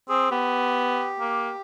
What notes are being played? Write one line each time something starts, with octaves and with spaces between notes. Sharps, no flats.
C4 G#4
B3 G4
A#3